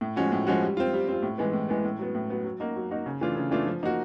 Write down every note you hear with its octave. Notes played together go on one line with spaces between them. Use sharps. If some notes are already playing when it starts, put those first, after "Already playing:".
A2
F3 G#3 C#4 F#4
A2
F3 G#3 C#4 F#4
G3
C4 F4
G3
C4 F4
A2
E3 G#3 B3
A2
E3 G#3 B3
A2
F#3 B3
A2
F#3 B3
F#3
A#3 D#4 F#4
F#3
A#3 D#4 F#4
C#3
E3 A3 D4 F4
C#3
E3 A3 D4 F4
F3
A#3 D#4 F#4